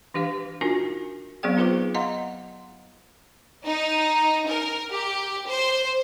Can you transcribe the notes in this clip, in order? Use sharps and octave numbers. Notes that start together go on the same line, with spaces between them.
E3 D4 G4 B4 F5
D4 D#4 F4 F#4 A#4 G#5
F#3 B3 C4 G#4 D5 G5
D#4 F4 G#4 B4 C5 D6
D#5 F5 F#5 A#5 C6
D#4
A#4
G4
C5